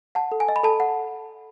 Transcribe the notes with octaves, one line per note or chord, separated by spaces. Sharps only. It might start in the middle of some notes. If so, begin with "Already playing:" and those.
F#5 A5
A4
G#5
D#5
B5
A4 A5
F#5